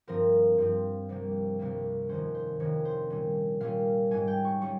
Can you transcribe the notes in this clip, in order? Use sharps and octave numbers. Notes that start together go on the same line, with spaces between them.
G2 F3 C4 A#4
G2 F3 C4
C2 C3 G3 A#3
C2 C3 G3 A#3
F2 C3 D#3 A#3 C#4 C5
C5
F2 C3 D#3 A#3 C#4 C#5
C5
A#2 G3 C#4
A#2 G3 C#4 F5
G#2 G3 C#4 G#5
G5
C#6
G3 C#4 C#6